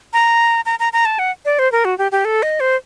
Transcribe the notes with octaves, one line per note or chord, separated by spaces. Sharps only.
A#5
A#5
A#5
A#5
A5
F#5
D5
C5
A#4
F#4
G4
G4
A4
D#5
C5